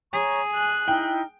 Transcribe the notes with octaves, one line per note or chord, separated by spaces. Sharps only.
G#4 C#5 A#5 C#6
G#5 F#6
D#4 E4 G5 F6